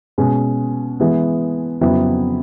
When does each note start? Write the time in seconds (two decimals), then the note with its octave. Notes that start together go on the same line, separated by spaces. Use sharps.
0.18 B2 G#3 C#4
1.00 E3 G#3 B3
1.81 F2 C#3 F#3 B3 E4